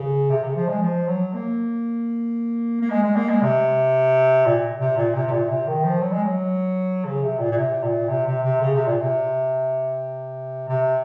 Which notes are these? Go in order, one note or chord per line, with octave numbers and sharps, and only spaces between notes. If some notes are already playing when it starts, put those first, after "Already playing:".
Already playing: C#3
C3
C#3
F3
G#3
F3
F#3
A#3
A#3
G#3
G#3
A#3
G#3
C3
A#2
C3
A#2
C3
C3
A#2
C3
D#3
F3
F#3
G#3
F#3
C#3
C3
A#2
A#2
C3
A#2
C3
C3
C3
C#3
C3
A#2
C3
C3